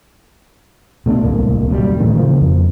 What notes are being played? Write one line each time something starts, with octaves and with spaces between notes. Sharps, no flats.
B2 A3 C4 D4
D1 C2 A#3
D#1 F#2 A2 G3
A2 D#3 E3 A3
C#3 F3 A#3
F2